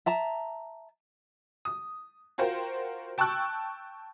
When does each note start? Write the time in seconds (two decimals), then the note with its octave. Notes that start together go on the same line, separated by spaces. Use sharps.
0.06 E5 A5 A#5
1.65 D#6
2.38 F4 F#4 A#4 C5 G5
3.18 G5 A5 C#6 E6 F#6